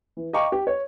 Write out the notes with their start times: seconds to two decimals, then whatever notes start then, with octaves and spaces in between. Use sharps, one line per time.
0.17 E3
0.33 D#5 F5 G5 A#5 C#6 D6
0.52 G4
0.67 C#5